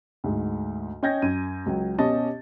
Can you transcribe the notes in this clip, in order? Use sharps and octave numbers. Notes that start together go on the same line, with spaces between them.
D2 G#2
C#4 D#5 G5 G6 G#6 A#6
F#2 D#7
C#2 F#3 G5
B2 C#4 G4 D#5 A5 A6